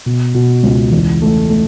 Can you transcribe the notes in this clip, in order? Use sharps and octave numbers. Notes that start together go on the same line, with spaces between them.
B2
B2
C#2
E2
A3
A3